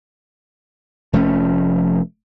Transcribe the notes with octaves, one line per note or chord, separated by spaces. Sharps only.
F1 F3 A3 C#4